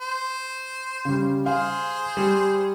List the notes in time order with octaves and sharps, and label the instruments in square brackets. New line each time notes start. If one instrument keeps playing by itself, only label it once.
[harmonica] C5
[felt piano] C#3 G3
[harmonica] G#4 C5 [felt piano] F5
[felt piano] G3